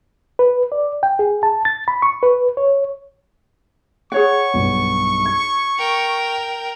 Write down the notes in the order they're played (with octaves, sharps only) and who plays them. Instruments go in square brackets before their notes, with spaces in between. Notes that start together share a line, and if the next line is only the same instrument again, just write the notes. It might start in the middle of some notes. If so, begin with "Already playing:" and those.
[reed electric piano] B4
D5
G5
G#4
A5
A6
B5
C#6
B4
C#5
[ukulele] G#4 C#5 F#5 [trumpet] C#6
[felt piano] B1 G2 B2
G#6
[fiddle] A#4 G5